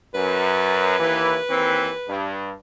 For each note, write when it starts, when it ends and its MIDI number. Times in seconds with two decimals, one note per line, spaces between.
0.14 0.98 42
0.14 2.32 71
0.99 1.37 39
0.99 1.37 52
1.49 1.91 39
1.49 1.91 52
1.49 1.91 60
2.08 2.52 43